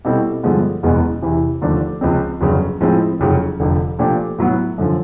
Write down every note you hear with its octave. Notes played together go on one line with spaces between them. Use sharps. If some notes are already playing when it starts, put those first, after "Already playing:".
B2 G3 C4 E4 A4
G2 D3 F3 G#3 B3
F#1 E2 B2 G#3 B3
E2 C3 E3
D#2 D3 F3 A3 D4
C#2 C#3 F3 G#3 C4
G1 F2 C#3 F#3
A2 F3 G#3 C4 E4
F#1 F2 C#3 F#3
F1 F2 D3
A#2 F3 A3 D4 G4
A2 F#3 B3
F#2 D3 F3